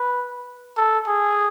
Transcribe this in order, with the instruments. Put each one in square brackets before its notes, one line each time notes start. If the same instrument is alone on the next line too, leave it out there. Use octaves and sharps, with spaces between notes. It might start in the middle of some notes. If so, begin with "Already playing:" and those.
Already playing: [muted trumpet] B4
A4
G#4